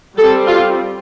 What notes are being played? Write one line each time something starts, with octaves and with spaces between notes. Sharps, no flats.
G3 C4 A4
F4